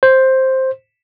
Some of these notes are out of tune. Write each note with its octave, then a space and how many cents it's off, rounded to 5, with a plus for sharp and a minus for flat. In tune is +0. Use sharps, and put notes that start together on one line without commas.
C5 +5